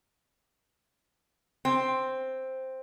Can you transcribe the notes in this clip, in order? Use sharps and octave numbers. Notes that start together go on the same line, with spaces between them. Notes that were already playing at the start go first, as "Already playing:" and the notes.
C4